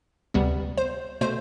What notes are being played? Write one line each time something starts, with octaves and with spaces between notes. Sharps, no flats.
D2 C3 G3 B3
C5
B2 A3 C5